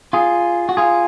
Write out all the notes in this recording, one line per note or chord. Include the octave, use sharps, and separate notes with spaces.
F4 G#4
F#4
F4 G#4